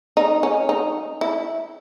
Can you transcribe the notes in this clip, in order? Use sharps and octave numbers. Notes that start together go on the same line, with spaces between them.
D#4
C#4
D#4
E4